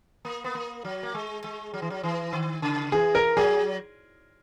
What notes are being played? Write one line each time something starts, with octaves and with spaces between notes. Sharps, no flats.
A#3
B3
A#3
F#3
A#3
G#3
G#3
F#3
E3
F#3
E3
D#3
C#3
E3 G#4
A#4
F#3 G#4